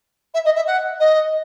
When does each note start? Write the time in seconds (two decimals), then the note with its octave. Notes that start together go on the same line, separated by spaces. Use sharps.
0.34 E5
0.45 D#5
0.56 E5
0.67 F#5
1.00 D#5